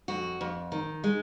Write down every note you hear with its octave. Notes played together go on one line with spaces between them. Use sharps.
F2 F#4
F2
D#3
G#3